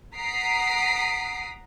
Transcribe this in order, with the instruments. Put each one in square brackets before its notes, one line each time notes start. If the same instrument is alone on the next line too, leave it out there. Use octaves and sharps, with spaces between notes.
[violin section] F#5 A#5 D#6 B6 C7 D7